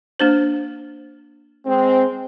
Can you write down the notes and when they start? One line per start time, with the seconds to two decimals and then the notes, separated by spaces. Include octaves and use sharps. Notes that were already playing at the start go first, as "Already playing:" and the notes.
0.20 A#3 D4 C5
1.66 G#3 C4